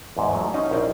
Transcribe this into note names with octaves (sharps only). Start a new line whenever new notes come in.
E2 G#2
F3 F#3 A3
C#4 D#4 D#5 F5 F#5
A#1 E4 A#4 C5 D5